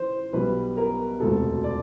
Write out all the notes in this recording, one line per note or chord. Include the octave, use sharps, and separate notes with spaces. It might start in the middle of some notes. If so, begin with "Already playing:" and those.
Already playing: E3 C5
B1 B2 G3 B4
A#4
E1 D2 C3 A4
D5